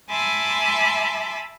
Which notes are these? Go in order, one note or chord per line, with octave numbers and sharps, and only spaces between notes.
E5 G#5 A5 B5 C6 D6